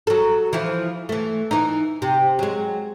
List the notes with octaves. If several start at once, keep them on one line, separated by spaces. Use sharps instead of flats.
F#3 A4
E3 F3 E4
E3 A3
E3 D#4
C3
F#3 G#3